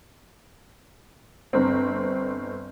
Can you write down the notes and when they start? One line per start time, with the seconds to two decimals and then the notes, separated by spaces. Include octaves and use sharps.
1.53 G1 C4